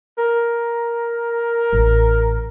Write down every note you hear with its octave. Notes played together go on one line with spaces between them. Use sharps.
A#4
A1